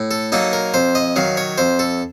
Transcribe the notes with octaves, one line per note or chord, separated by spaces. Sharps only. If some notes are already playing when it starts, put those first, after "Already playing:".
Already playing: A2
A4
F#3 A#3 D#4 A4
A#4
F2 C5
D#5
D#3 F#3 F5
C#5
F2 C5
A4